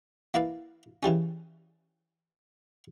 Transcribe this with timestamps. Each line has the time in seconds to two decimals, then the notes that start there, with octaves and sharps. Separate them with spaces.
0.34 A#3 E4 B4 D5 F5
1.03 C#3 E3 G3 C#4